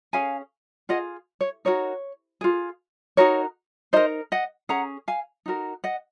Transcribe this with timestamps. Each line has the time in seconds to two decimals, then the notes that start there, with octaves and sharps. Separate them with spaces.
0.13 C#4 G#4 F5 G#5
0.89 F4 G#4 D#5 F#5
1.41 C#5
1.65 D#4 F#4 A#4 C#5
2.41 F4 G#4
3.17 D#4 F#4 A#4 C#5
3.93 D#4 A#4 C5 D#5
4.32 D#5 F#5
4.69 C#4 G#4 F#5 A#5
5.08 F5 G#5
5.46 D#4 F#4 A#4
5.84 D#5 F#5